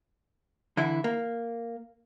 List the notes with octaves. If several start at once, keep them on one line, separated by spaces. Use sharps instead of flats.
D3 E3 E4
A#3